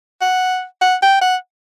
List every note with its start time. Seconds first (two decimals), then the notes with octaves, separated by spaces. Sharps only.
0.21 F#5
0.82 F#5
1.02 G5
1.21 F#5